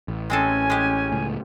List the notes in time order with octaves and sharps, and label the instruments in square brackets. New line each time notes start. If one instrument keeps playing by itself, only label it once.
[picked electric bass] A1
[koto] G#3 C4 A4 [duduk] C#4 [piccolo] G#5
[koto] G#3 G4
[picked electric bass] C#2 A2